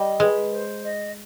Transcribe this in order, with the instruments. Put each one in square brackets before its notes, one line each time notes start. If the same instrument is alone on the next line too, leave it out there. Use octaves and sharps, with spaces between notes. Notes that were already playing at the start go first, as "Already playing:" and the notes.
Already playing: [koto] G3 [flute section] D#5
[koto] G#3 [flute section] B4
[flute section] C5
D#5